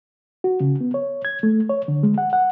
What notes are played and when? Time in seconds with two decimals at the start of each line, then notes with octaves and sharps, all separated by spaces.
0.44 F#4
0.60 C#3
0.81 B3
0.94 C#5
1.25 G#6
1.43 A3
1.69 C#5
1.88 D3
2.03 G#3
2.18 F#5
2.33 F#5